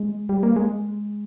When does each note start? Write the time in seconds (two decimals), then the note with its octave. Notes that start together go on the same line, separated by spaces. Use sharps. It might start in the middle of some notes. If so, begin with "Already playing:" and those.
Already playing: G#3
0.29 G3
0.43 A#3
0.56 G#3